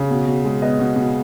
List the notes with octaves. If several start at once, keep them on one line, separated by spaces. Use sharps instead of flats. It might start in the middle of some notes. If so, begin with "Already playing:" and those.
Already playing: C#3
B2
B2
G#3
B3 D#5
B2
B2